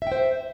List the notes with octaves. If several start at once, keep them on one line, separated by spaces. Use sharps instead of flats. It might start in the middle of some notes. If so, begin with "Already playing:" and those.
C5 E5 G5